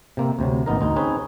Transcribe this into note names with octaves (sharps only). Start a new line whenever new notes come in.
C3 A#3 C4
D2 C3 F#3
A1 B3 D#4 A#4
D2 D#4
C4 C#4 D#4 G#4 B4